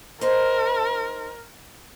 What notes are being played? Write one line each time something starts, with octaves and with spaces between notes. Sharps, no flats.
D#4 A#4 C5